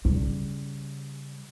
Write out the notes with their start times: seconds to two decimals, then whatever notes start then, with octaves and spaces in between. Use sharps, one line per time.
0.05 C#3 G3